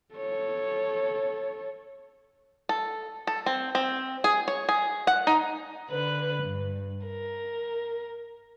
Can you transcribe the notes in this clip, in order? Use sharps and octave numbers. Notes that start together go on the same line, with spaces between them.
A4 C#5
A4
A4
C4
C4
G#4
C#5
G#4
F#5
D#4
D3 B4 F#6
G2
A#4